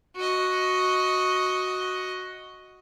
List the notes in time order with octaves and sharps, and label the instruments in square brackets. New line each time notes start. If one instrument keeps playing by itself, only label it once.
[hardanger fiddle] F#4 D#5